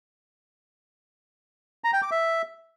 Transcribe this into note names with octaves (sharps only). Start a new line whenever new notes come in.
A#5
G5
D6
E5